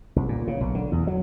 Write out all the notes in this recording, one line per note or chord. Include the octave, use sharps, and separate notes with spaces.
C2
A#2
C#3
B1
D3
E2
F#3